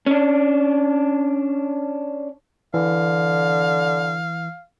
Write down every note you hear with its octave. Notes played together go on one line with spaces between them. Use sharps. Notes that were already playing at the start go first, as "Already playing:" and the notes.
C#4 D4
D3 E3 F5